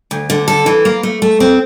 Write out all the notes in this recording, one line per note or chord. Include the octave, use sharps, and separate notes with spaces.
D2
D3
A4
E3
A#3
A3
A3
C4